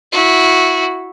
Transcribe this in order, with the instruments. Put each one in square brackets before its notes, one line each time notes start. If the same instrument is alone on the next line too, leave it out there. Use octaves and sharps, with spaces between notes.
[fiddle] E4 F#4